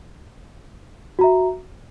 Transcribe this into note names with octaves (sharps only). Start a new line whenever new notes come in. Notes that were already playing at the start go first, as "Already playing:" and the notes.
F#4 E5 A#5